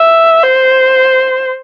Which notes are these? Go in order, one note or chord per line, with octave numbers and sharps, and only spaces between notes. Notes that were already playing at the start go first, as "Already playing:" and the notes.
Already playing: E5
C5